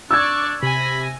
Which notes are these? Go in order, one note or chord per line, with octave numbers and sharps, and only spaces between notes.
D4 D5 C#6 E6 G#6
C3 G#5 B5 A#6